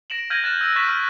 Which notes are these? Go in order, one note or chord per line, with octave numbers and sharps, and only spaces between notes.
A#6 D7 E7 F#7
F6 G6 G#6 A#6 D#7 F#7
F#6 A6 E7
E6 F#7
C#6 F#6 A6 B6 E7
F6